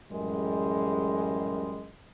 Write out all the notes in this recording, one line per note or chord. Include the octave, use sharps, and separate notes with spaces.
A1 F#2 G3 G#3